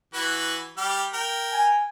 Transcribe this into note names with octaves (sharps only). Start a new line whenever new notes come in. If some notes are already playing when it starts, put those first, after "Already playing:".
E3 F#4 B4
G3 G4 F6
A#4 G5
G#5